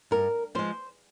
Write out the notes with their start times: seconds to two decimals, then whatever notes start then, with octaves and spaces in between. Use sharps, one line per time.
0.11 G2 A#4
0.55 F3 G#3 C5